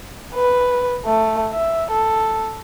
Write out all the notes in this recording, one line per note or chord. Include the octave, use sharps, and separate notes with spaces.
B4
A3
E5
A4